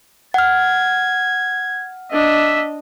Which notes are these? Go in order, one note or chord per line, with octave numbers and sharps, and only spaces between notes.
F#5 F6 G#6
D4 D#5 E5